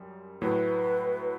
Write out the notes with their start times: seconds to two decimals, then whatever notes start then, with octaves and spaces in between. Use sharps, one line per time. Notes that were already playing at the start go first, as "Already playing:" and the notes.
Already playing: F#2 G3
0.42 A2 F#3 A3 B4